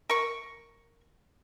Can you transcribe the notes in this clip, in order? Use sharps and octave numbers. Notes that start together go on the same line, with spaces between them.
A#4 C#6